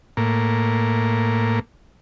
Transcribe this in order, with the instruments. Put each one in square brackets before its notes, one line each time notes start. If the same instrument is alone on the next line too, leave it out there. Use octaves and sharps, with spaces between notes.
[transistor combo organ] A2 A#3